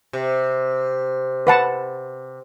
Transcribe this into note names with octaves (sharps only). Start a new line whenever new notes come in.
C3
B4 F#5 A5